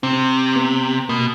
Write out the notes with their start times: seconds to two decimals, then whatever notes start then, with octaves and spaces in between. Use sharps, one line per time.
0.03 C3 C4
0.56 B3
1.09 B2 A#3